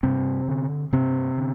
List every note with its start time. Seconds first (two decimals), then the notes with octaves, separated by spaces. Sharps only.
0.03 G2 C3 C4
0.48 D3
0.93 G2 C3 C4
1.38 D3